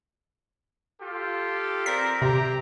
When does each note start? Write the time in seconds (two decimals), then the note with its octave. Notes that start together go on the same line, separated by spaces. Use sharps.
1.01 F4 G4 A4
1.86 C4 A#4 D5 B6
2.22 C3 C4 G4 A#5